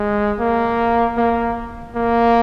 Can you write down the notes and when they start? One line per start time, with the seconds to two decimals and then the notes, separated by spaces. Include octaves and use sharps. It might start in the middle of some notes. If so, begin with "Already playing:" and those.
Already playing: G#3
0.39 A#3
1.17 A#3
1.95 A#3